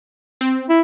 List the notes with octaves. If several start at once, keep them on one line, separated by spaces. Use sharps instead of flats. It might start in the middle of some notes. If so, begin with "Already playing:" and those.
C4
E4